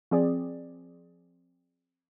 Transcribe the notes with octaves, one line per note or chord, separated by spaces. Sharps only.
F3 C4 G#4 D5